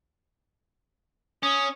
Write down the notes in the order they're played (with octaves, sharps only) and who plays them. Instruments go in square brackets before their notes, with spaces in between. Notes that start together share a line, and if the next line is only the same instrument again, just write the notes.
[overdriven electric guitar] C#4 [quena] D#6